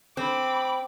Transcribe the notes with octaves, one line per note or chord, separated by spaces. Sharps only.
C4 B5 D6